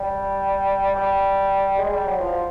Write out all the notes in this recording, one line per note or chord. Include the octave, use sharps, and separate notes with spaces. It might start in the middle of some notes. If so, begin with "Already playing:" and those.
Already playing: G3
G3
G#3
G3
F#3
F3